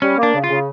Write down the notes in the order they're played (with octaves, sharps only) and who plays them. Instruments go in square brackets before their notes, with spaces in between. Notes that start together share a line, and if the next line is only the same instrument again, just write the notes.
[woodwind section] G3 [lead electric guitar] C#4
[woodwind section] A#3
[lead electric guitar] D4
[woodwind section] C#3
[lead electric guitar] F4
[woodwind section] C#3